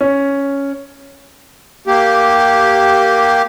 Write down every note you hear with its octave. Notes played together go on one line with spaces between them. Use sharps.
C#4
A#3 G4